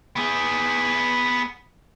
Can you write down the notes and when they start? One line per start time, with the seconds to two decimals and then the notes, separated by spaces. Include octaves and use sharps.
0.16 B3 G#4